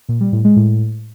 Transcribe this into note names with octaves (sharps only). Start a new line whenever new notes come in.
A#2
G3
A2
G#3
A2